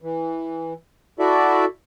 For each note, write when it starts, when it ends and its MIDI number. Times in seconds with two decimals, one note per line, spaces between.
0.02 0.73 52
1.19 1.65 64
1.19 1.65 66
1.19 1.65 69
1.19 1.65 74
1.19 1.65 76